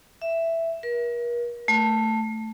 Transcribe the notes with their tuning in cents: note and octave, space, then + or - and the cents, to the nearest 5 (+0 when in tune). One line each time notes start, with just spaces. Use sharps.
E5 +5
A#4 +40
A3 +10